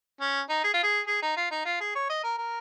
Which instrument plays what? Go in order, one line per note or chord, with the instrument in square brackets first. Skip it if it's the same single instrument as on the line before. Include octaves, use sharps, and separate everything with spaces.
[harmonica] C#4
D#4
G#4
F4
G#4
G#4
D#4
F4
D#4
F4
G#4
C#5
D#5
A#4
A#4